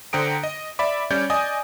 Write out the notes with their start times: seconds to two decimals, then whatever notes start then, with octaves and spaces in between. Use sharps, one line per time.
0.13 D3 C5 G5 A#5 D#6 D7
0.43 D#5
0.79 D5 E5 B5 D6
1.11 G3 C#4 C#5 D5 G6
1.30 D5 D#5 G#5 D#6